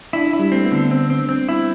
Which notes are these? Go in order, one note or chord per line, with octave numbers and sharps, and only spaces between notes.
D4 E4
D4
E4
G3
A3 C4
B3
D3
C4
C4
C4
E4